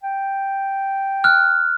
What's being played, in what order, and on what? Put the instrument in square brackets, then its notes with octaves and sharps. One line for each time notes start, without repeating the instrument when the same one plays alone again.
[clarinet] G5
[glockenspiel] F6 F#6